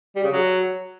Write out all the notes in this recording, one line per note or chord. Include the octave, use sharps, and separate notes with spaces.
G3
C#3
F#3